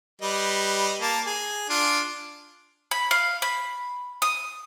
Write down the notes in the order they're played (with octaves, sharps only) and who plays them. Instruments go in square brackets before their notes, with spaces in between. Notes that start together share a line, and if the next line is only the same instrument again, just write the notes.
[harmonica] G3 B4 D#5
A#3 A5
G#4
D4 F4
[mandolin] B5
F5
B5
D#6